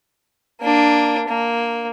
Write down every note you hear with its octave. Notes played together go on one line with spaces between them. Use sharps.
A#3 D4
A#3